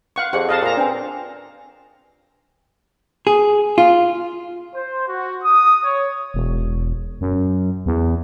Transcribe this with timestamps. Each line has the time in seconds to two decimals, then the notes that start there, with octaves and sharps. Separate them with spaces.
0.16 F5 F#5 C#6
0.33 F2 G4 G#4 D5 F#5
0.49 D#5 F5 A5
0.62 A#2 F5 A#5
0.77 C4 D4 B4 G#5
3.27 G#4
3.78 F4
4.74 C5
5.08 F#4
5.43 D#6
5.83 C#5
6.34 E1
7.21 F#2
7.86 E2